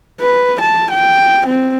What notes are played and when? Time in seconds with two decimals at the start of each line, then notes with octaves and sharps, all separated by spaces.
0.20 B4
0.60 A5
0.90 G5
1.46 C4